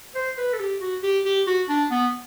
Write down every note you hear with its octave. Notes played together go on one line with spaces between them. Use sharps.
C5
B4
A4
G4
F#4
G4
G4
F#4
D4
B3